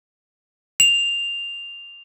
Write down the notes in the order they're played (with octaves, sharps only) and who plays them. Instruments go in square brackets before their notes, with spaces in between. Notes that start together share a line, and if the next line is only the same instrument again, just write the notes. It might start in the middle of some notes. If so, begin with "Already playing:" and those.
[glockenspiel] F7